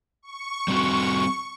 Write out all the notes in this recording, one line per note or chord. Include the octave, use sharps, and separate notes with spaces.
C#6
G3 C4 F#4